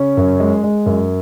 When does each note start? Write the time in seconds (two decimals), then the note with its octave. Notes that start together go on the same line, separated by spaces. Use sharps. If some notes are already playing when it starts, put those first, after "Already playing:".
Already playing: C#3 C#4
0.17 F#2
0.40 G#3
0.64 G#3
0.86 F#2